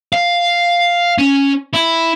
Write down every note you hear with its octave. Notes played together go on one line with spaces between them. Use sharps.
F5
C#4
E4